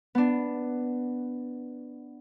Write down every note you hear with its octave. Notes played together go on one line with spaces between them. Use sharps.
B3 D4